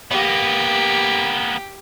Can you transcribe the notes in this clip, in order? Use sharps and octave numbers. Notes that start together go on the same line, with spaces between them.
A#3 B3 G4